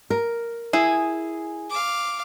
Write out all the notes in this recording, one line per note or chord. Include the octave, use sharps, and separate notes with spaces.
A#4
E4 G#4
F5 D6